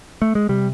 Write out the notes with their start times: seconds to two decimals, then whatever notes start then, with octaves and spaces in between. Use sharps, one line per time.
0.22 A3
0.35 G#3
0.49 C3 G3